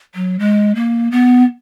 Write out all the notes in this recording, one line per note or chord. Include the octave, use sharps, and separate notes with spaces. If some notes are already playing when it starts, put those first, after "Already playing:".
F#3
G#3
A#3
B3